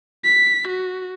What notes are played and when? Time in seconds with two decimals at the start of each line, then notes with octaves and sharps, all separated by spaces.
0.24 B6
0.68 F#4